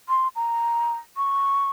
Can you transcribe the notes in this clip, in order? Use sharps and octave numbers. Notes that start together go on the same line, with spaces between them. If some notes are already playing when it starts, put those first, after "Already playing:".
C6
A#5
C#6